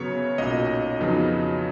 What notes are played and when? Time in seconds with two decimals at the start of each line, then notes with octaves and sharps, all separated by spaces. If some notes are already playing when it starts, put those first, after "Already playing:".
Already playing: F#2 C#3 F#3 B3 C#5
0.38 B1 A#2 F#3 C#4 D#5
1.00 F2 C#3 F#3 B3 D#4